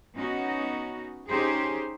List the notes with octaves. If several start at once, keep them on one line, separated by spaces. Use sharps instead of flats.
B3 C#4 D#4 F#4
C#4 D#4 G4 G#4 C5